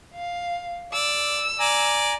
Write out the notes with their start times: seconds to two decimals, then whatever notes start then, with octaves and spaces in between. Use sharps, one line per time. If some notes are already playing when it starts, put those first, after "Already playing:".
0.15 F5
0.94 D5 E6
1.60 D5 G#5 A#5